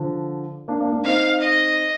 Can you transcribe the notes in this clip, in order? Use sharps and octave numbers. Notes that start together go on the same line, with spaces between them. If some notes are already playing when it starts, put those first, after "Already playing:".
Already playing: D3 F3
A#3 D4
A#3 D4
A#3 D4
C4 D#4 F5
D#5